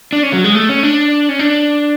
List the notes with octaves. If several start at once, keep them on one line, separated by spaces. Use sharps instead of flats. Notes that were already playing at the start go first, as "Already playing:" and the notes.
D4
C#4
F#3
G#3
A3
C#4
D4
C#4
D4